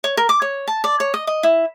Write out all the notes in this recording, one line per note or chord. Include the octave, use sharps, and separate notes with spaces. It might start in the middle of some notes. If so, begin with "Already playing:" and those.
C#5
A#4
D6
C#5
A5
D5
C#5
D#5
D#5
E4